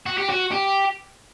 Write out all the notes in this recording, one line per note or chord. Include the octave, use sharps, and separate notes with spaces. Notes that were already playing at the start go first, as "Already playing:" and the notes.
F#4
G4
F#4
G4